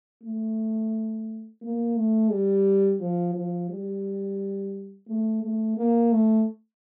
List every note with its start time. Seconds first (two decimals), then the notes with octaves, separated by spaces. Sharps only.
0.23 A3
1.62 A#3
1.96 A3
2.31 G3
3.01 F3
3.35 F3
3.70 G3
5.08 A3
5.42 A3
5.77 A#3
6.12 A3